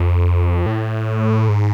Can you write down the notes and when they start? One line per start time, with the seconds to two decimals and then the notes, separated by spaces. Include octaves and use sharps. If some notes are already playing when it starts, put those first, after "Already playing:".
Already playing: F2
0.66 A2
1.49 G#2